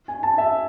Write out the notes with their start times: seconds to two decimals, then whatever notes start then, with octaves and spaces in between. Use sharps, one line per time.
0.08 G#5
0.23 A5
0.38 E5